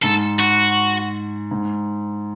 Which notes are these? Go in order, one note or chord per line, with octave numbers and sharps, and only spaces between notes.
G#2 A4
F#4
G#2